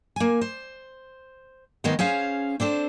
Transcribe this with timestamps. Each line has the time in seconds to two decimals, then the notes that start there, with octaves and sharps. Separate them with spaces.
0.16 A#3 G#5
0.41 C5
1.84 D#3 G#3 B3 A#4 C5 D#5
1.99 C#4 G#4 C5 F5
2.60 C4 D4 A4 C5